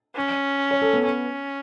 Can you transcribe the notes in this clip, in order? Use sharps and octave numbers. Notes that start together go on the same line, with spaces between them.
C#4
C#5
A4
B3
C#4